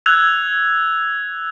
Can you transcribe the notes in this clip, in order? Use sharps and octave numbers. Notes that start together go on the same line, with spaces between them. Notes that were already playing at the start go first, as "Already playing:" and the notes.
E6 F#6 G#6 F7